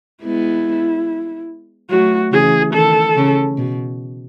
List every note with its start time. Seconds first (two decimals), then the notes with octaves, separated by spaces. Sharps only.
0.23 G#3 B3 E4
1.90 F#3 A3 F#4
2.32 C#3 E3 G#4
2.74 D#3 A4
3.17 C#3
3.58 B2